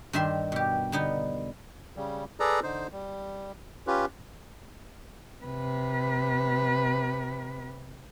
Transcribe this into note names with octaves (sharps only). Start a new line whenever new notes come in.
G2 D#3 E5 C6
B2 G4
D3 B3 D#4
C#3 G3
G#4 A4 B4 D5 A#5
D3 D#4 C5
G3
C#4 F4 G4 B4
C3 B4